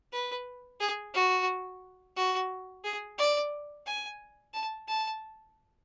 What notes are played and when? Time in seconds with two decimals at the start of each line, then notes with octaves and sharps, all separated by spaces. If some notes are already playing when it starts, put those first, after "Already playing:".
0.12 B4
0.80 G#4
1.14 F#4
2.16 F#4
2.84 G#4
3.18 D5
3.86 G#5
4.54 A5
4.88 A5